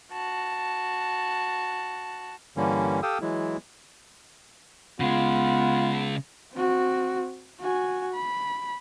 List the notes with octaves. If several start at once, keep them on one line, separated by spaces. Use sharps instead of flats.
F#4 A5
G2 D3 E3 G3 A#3 C#4
G4 A4 F5 G5 D#6 E6
E3 F#3 G#3 E4
C#3 G#3 B3 F4
C4 F#4
F#4 G#5
B5